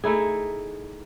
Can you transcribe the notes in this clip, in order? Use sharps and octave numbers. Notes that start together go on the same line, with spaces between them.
A3 D#4 E4 G#4